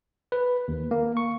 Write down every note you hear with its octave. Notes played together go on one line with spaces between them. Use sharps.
B4
D#2
A#3
C#6